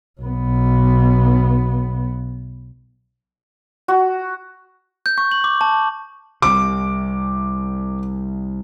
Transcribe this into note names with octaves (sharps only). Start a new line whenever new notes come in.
B1 B3
F#4
G6
C#6
F#7
D6
A5
C2 C3 D6